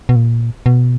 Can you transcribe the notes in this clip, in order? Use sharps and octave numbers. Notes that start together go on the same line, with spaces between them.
B2
A#2
B2